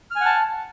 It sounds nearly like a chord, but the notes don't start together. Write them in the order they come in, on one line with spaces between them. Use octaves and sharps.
F6 G#5 F#5 A5